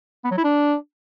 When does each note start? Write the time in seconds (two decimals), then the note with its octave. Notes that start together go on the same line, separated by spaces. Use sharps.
0.24 B3
0.31 F#3
0.38 E4
0.44 D4